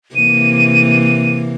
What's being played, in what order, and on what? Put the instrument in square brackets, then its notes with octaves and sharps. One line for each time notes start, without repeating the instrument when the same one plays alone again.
[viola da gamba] C3 E3 A#3 [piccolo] D#7